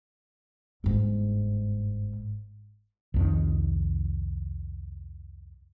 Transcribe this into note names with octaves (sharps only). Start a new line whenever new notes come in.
G1 G#2
C2 F2 D#3